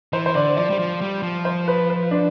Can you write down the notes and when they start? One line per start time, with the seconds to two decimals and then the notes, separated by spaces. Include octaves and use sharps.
0.13 E3 C5
0.26 C5
0.34 D3 D5
0.57 F3 D5
0.70 G3
0.79 F3
1.01 G3
1.23 F3
1.45 C5
1.68 B4
1.90 B4
2.11 D4